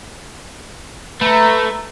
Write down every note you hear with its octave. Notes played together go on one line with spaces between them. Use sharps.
A3 B4 A#5